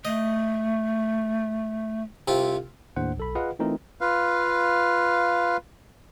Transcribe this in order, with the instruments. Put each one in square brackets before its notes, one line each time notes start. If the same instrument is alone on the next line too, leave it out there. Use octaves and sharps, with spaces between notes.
[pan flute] A3 [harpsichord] D#5
[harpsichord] C2 C3 F4
[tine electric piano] D#2 A2 D4 C5 F#5
B1 A4 B5
F4 G#4 B4 D#5 F5 F#5
E3 A3 C4 D#4 F4 A#4
[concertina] F4 B4 F5